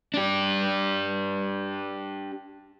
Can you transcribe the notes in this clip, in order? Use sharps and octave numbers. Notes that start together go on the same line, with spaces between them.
D4 G4